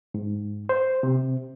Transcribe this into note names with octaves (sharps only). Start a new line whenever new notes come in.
G#2
C5
C3